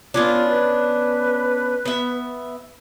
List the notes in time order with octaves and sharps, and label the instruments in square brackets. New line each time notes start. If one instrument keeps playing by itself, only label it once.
[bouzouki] B3 C#4 D4 [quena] F4
[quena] B4
[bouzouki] B3 E5